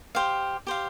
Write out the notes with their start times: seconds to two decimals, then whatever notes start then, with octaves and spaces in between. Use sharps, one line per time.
0.15 G4 C5 F5
0.67 G4 C5 F5